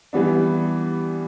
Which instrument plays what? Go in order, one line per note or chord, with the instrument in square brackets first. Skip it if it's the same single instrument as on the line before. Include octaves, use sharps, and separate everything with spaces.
[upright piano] E3 G3 B3 D4